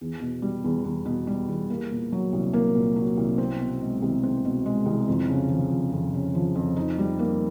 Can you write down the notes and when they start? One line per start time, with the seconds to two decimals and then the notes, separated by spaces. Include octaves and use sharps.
0.01 E2
0.21 B2
0.42 G3
0.64 E2
0.84 E2
1.06 B2
1.27 G3
1.48 E2
1.70 A#3
1.91 A#2
2.12 F#3
2.33 C2
2.53 A#3
2.75 A#2
2.96 F#3
3.17 C2
3.38 C4
3.60 B2
3.81 G#3
4.02 C2
4.23 C4
4.45 B2
4.66 G#3
4.86 C2
5.08 F2
5.28 C#3
5.49 F3
5.70 F2
5.92 F2
6.14 C#3
6.35 F3
6.55 F2
6.76 D#4
6.98 G3
7.19 A#3